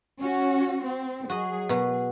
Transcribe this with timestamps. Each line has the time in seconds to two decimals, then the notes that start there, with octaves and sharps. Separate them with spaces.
0.19 C#4 F#4
0.83 C4
1.30 F#3 F#4 G#4 D#5
1.69 B2 B3 F#4